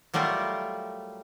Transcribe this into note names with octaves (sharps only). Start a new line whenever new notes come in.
F#3 G3 A3 F4 A#4